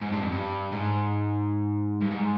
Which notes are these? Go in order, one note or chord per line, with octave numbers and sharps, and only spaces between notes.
G#2
G2
F2
G2
G#2
G2
G#2